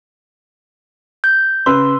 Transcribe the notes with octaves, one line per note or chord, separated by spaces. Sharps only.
G6
C#3 B4 C6 E6